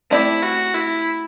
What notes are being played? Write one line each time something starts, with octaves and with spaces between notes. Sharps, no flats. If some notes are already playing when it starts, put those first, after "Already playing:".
A3 C4 E4 G4 D5
F#4
E4